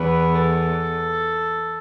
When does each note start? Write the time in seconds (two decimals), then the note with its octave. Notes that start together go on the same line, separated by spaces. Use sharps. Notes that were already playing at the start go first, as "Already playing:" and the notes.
Already playing: E2 B4
0.34 A4